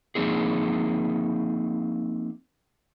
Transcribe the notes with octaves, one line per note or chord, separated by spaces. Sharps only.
F3 A#3 C4 D#4 G#4